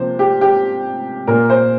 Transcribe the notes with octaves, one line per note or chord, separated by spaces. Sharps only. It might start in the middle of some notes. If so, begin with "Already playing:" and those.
Already playing: C3 F3 A#3 C5
G4
G4
A#2 A#3 A#4
C5